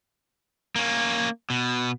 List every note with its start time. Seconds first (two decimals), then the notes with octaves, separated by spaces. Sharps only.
0.76 A#3 C#4
1.50 B2